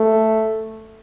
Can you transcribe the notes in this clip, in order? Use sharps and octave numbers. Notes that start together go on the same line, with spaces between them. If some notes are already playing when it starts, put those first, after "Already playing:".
Already playing: A3